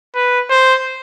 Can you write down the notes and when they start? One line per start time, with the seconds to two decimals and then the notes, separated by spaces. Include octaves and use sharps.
0.15 B4
0.50 C5